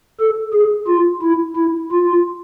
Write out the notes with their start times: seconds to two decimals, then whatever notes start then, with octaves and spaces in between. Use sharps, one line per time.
0.19 A4
0.54 G#4
0.88 F4
1.22 E4
1.56 E4
1.92 F4